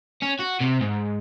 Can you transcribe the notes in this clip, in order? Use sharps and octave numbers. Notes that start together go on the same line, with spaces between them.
C#4
F#4
C3
G#2